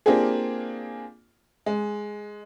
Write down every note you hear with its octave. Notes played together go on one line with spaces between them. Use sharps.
A#3 C4 D4 F4 G4 G#4
G#3